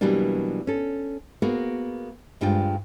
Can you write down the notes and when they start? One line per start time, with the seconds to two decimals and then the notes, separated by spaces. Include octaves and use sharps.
0.01 B2 E3 F#3 G3 A#3 D4
0.67 C#4 A4
1.42 A#3 B3 F#4 G#4 A#4
2.41 D2 G2 G#3 D4 F4 G5